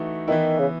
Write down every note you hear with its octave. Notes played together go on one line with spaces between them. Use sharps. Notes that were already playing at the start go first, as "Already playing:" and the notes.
Already playing: E3 A3 D#4 F#4
D#3 E3 B3 E4
C#3